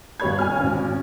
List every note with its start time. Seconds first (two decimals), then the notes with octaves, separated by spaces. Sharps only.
0.20 G1 B2 G4 C#5 B5 G#6
0.39 G#5 F6
0.60 G#1 C4 C#4